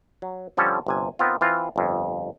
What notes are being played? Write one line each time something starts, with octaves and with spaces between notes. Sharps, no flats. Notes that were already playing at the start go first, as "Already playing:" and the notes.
F#3
D3 F3 G3 C#4 A4
G1 C3 G#5
D#3 B3 C4 F4
E3 C4 F4
G1 F2